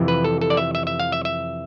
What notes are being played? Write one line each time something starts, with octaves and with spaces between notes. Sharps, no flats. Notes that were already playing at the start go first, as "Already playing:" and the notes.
Already playing: F2 C3 E3
B4
A4
A4
D5
E5
E5
E5
F5
E5
E5